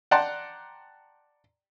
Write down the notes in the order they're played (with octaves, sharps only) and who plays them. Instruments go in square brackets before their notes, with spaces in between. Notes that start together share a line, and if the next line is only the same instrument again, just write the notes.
[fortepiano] D5 F#5 G5 A5 A#5 C6